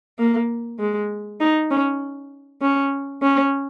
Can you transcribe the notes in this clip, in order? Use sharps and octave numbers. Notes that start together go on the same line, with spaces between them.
A#3
G#3
D#4
C#4
C#4
C#4